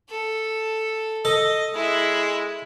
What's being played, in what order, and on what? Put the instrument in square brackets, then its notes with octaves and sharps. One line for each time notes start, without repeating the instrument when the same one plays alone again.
[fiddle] A4
[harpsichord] A4 [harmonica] D#5
[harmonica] G#3 [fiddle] E4